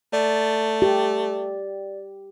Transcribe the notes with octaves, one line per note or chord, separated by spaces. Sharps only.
A3 D5
G4